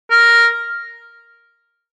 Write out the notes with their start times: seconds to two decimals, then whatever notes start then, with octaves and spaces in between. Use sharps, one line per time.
0.11 A#4